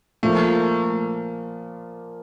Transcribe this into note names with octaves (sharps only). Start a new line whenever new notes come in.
A#2 F3 A3 A#3